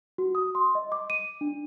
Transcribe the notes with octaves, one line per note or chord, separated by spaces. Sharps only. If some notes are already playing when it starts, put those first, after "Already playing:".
F#4
D#6
C6
D#5
D6
D#7
D4